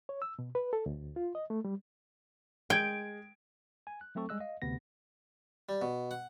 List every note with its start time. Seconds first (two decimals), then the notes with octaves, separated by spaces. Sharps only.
0.09 C#5
0.22 E6
0.39 B2
0.55 B4
0.73 A4
0.86 D2
1.16 F4
1.35 D#5
1.50 A3
1.65 G3
2.70 G#3 G5 G#6 D7
3.87 G#5
4.01 F#6
4.15 F#3 A3 C4 A4 C#6
4.29 G3 G#3 D#5 E6 F#6
4.40 D#5 F5
4.62 D2 C3 B3 A#6
5.69 G3
5.82 B2
6.11 F#5